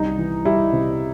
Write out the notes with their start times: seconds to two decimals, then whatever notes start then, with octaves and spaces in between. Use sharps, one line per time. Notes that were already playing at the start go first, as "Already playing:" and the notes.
Already playing: C2 G3 D#4
0.19 E3
0.45 G3 E4
0.73 C3